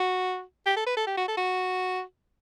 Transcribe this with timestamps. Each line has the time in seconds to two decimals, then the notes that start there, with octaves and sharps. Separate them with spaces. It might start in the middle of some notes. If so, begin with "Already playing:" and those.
Already playing: F#4
0.66 G4
0.76 A4
0.87 B4
0.97 A4
1.07 G4
1.17 F#4
1.28 A4
1.37 F#4